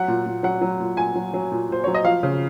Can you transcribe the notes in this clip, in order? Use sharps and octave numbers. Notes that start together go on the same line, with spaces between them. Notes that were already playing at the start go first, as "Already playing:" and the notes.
Already playing: F#3 F#5
A#2
A#2
F#3 F#5
F#3
A#2
A#2 G#5
F#3
F#3
A#2
A#2 C5
F#3 C#5
D#5
F3 F5
C#3